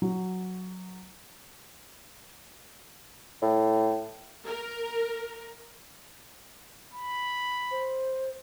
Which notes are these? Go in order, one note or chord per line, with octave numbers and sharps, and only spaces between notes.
F#3
A2
A#4
B5
C5